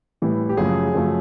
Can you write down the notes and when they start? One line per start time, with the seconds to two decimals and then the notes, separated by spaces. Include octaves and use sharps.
0.22 A2 E3 G3
0.49 G4
0.57 F#2 C#3 F3 A3 G#4
0.94 F#2 C#3 F3 A3